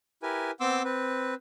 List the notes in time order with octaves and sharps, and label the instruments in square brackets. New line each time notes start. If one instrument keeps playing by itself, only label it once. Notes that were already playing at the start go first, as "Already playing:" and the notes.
[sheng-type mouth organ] E4 G4 A#4 B4 G#5
B3 C4 C6 D6 E6
C4 B4